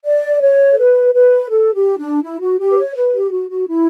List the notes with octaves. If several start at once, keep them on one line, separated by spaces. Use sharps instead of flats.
D5
C#5
A4
B4
B4
A4
G4
D4
E4
F#4
G4
B4
C#5
B4
G4
F#4
F#4
E4